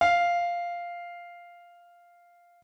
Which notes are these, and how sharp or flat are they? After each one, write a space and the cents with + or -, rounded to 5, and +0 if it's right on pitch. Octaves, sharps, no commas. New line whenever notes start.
F5 -5